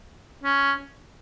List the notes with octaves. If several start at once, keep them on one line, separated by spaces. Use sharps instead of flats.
C#4